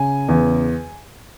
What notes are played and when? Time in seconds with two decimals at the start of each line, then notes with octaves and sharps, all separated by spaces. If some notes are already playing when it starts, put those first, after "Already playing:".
Already playing: C#3 G#5
0.29 E2